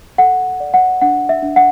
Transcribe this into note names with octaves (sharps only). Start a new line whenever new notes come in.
A4 F#5
D5
F#5
D4 F#5
E5
D4
F#5